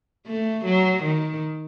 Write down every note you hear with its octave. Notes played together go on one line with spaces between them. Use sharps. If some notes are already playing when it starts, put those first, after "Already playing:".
A3
F#3
D#3